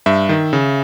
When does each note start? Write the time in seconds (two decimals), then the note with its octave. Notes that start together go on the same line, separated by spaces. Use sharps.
0.06 G2 E5
0.29 D#3
0.53 C#3